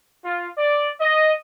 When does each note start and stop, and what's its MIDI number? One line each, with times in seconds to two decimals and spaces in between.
0.24 0.48 65
0.57 0.88 74
1.00 1.31 75